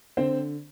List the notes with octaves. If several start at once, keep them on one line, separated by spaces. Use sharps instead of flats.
D3 C4 C5